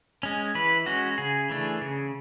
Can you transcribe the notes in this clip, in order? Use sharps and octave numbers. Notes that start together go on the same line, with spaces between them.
G#3 C#4
E3 B4
G#3 C#4 F#4
C#3 G#4
E3 A3 D4
C#3